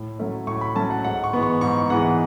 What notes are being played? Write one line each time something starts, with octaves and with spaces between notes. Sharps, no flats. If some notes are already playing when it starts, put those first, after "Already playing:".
Already playing: A2
F#3 A3 C#4
A2 C#6
B5
F#3 A3 C#4 A5
F#5
G#2 F#5
C#6
E3 G#3 B3
C#6
G#2 C#6
E3 G#3 B3 F#5